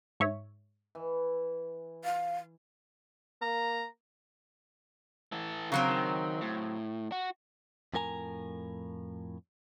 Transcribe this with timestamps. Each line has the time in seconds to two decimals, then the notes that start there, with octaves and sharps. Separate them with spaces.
0.20 G#2 C#5 E5
0.95 E3
2.05 F5
3.42 A#3 A#5
5.32 E3 A4
5.72 C#3 F#3 C4 A#4
5.88 D#3
6.41 A2
7.12 F#4
7.94 F2 A2 A#4 G#5 A#5